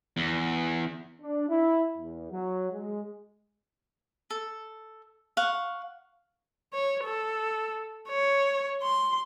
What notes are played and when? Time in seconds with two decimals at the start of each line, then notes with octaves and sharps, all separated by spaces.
0.17 E2
1.21 D4
1.49 E4
1.98 E2
2.32 F#3
2.72 G#3
4.30 A4
5.37 F5 F#5 C#6
6.73 C#5
7.04 A4
8.09 C#5
8.83 C6